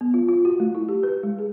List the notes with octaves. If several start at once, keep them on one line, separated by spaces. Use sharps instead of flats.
B3
F4
F4
F#4
A3
E4
G4
B4
G#3
G#4